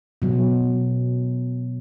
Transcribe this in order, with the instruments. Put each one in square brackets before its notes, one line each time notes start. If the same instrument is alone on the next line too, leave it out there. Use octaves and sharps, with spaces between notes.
[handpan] B2 F#3